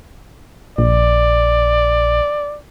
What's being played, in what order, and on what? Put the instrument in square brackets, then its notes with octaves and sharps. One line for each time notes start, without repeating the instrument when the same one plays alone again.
[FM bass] A#1 [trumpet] D5